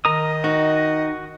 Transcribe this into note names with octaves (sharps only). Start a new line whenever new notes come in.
D#3 A#4 D#5 D#6
D#4 F#4